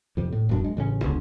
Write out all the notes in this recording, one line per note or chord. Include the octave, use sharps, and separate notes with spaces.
F2 C3
A2
D#1 F#2 D4
G#3
A1 C#3 G3 C#4
E1 C#2 D3